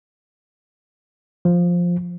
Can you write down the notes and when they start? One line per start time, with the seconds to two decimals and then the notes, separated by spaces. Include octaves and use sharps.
1.45 F3